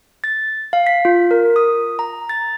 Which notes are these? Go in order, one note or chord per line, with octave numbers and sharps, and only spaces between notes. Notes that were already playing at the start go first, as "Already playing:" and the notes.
A6
F5
B6
F4
A#4
D#6
A#5
A6